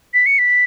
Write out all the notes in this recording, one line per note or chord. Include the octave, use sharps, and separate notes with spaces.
B6
C#7
B6